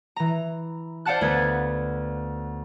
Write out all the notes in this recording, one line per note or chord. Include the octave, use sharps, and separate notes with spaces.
E3 A#5
C5 D5 F5 F#5 A5 F#6
D2 B3 B4 G#6 A6